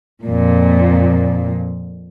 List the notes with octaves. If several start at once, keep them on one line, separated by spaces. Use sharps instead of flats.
F2 A#2